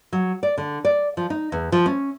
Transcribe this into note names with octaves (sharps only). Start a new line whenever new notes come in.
F#3
D5
D3
D5
F3
D#4
E2
F3
C#4